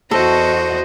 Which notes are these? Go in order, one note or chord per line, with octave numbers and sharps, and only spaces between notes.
E2 F#4 A4 C5 D#5